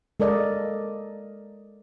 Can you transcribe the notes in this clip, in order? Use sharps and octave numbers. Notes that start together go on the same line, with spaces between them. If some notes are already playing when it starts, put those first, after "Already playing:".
G#3 A4 A#4 D5 D#5